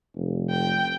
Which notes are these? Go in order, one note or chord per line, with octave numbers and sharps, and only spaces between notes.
F1
G5